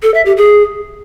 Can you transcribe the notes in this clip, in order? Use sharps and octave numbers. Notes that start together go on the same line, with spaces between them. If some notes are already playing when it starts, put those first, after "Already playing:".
A4
E5
G4
G#4